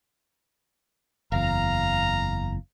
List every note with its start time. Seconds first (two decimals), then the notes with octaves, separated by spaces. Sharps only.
1.32 F#1 E2 F5 A#5